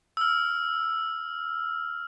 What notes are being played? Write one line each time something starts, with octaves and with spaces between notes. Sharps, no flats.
E6 F6